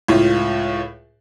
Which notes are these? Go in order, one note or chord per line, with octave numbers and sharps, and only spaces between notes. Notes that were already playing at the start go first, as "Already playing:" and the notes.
C#2 A2 F4